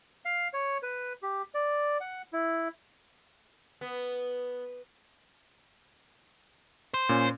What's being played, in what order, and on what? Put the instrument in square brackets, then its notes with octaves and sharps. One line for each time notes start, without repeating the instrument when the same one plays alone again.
[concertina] F5
C#5
B4
G4
D5
F#5
E4
[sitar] B3
[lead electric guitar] C5
[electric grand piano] A#2 C#4